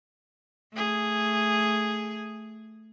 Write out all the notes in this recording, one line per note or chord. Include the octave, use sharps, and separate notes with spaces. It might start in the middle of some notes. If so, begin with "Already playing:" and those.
A3 G#4